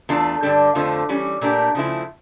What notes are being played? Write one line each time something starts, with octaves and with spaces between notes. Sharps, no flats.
E2 E3 A3 D4 F4
G2 D3 G3 D4 A4
F2 D3 F3 A3
E3 G3 C#4
A#2 A3 D4 G4 A#4
C#3 F3 A3 E4